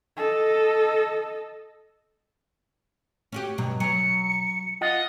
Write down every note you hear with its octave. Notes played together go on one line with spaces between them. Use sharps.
A4 D#5
C#4 F#4 G4
B1 G2 B2 F#3
F#3 C#7
F4 D#5 F#5